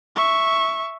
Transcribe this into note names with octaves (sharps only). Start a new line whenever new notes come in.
E5 C#6